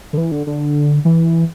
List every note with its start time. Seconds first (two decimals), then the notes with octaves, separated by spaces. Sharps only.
0.13 D3
0.18 E3
0.32 D3
0.47 D3
1.05 E3